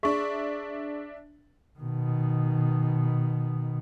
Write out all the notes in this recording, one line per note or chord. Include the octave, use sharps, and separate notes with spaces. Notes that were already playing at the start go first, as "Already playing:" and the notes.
D4 G#4 E5 C#6
B2 D#3